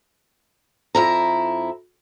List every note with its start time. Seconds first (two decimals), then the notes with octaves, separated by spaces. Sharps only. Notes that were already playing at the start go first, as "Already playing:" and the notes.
0.95 F2 E4 A#5